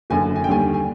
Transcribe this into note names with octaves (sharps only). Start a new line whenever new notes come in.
F#1 F#2 D3 G#5
G#5
G5
D#2 D3 G3 G#5
G#5